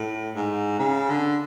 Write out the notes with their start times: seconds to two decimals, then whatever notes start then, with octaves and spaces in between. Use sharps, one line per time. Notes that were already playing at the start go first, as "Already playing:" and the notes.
Already playing: A2
0.35 G#2
0.79 C#3
1.09 D3